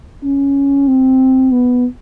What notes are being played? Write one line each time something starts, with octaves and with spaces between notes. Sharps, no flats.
C#4
C4
B3